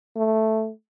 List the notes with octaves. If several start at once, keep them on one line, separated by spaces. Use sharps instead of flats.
A3